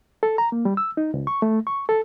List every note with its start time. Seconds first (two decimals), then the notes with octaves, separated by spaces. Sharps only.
0.23 A4
0.38 A#5
0.52 A#3
0.65 G3
0.77 E6
0.97 D#4
1.14 C#2
1.27 C#6
1.42 A3
1.67 C#6
1.89 A4